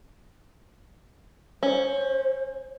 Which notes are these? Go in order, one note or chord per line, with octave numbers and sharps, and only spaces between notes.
C#4 C5